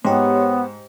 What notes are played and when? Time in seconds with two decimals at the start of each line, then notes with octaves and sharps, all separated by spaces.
0.05 G#2 B3 G4 C5 C#5